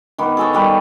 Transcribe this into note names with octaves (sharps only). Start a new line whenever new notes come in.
D#3 B3 D6
G#4 A4 C#5
D#3 G3 B4